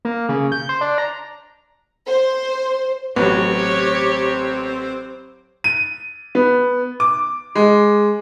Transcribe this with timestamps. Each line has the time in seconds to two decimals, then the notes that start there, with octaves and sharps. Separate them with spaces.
0.05 A#3
0.29 C#3
0.52 G6
0.69 C5
0.81 D4
0.98 A#5
2.09 C5
3.16 A1 F#3 B3 C4 G4 C#5
5.64 D#7
6.35 B3
7.00 D6
7.55 G#3